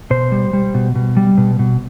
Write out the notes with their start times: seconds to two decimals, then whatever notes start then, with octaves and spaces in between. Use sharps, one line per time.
0.10 B2 C5
0.32 G3
0.53 G3
0.74 B2
0.95 B2
1.17 G3
1.38 B2
1.59 B2